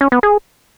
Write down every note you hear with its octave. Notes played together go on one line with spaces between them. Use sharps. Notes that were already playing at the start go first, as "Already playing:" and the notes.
C#4
B3
G#4